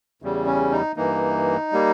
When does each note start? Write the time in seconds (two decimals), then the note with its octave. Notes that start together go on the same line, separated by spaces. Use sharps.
0.22 E2 C#3 G3
0.47 C#4
0.72 D#4
0.96 G2 E3 A#3 D#4
1.72 G3 A#3